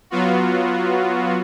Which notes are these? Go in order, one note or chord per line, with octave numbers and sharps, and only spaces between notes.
F#3 B3 F4 F#4